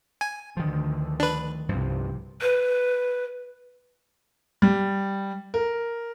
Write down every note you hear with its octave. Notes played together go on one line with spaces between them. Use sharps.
G#5
D2 D3 D#3 F3
D4 B4
C2 G2 C3 F3
B4
G3
A#4